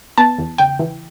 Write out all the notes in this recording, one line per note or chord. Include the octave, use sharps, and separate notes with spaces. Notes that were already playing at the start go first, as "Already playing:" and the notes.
B3 A5
E2
C#3 G5
E3